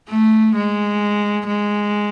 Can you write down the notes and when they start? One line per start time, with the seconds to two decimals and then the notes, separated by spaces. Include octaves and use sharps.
0.10 A3
0.56 G#3
1.47 G#3